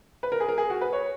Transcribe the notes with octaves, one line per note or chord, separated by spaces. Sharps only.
B4
A#4
G#4
A#4
G#4
F#4
B4
C#5